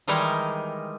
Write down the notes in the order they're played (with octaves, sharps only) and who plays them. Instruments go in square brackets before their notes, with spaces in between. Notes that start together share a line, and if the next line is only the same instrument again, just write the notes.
[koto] D#3 E3 G3 G#3 D#4 A#4